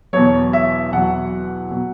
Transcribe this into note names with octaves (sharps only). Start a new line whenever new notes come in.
E2 B2 F#3 C#5
E5
E2 B2 F#3 F#5
B2 F#3